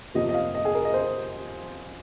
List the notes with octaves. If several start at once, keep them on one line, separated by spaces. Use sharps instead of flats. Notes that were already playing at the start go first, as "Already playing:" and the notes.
F2 C3 F3 A#3 D#5
D#5
F5
D#5
G#4
A#4
D#5
C5